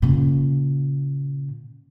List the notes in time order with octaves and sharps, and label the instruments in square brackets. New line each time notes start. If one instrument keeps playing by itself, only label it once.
[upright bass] A#2 C#3